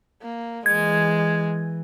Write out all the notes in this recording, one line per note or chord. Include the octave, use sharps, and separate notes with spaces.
A#3
E3 G#3 G#6